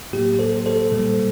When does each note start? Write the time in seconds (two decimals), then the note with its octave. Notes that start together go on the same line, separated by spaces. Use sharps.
0.13 A2 F#3 A#3 G4
0.39 A4 C5
0.66 A4 C5
0.92 A#2 G3 A#3